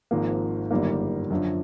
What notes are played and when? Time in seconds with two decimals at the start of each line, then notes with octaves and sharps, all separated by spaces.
0.11 G#1 G#2 F3 A#3
0.71 G1 F#2 D#3 G3 A#3
1.31 F#2 D3 F3